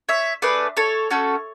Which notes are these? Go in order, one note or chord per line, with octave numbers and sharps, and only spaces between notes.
C#5 E5
A3 D4 G#4 B4 D5
A4 C#5
A3 C#4 F#4 A4